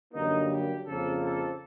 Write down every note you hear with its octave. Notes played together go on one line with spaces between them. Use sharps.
F#2 D3 G3 A#3 D#4
G4
F2 C#3 F3 A#3 A4
A4